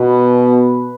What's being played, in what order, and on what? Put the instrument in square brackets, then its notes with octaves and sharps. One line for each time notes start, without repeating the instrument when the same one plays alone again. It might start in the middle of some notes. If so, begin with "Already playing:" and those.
Already playing: [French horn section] B2 [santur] B4